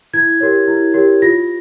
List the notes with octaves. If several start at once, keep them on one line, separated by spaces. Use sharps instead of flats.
E4 G#6
G4 A#4 C#5
E4
G4 A#4 C#5
F4 A#6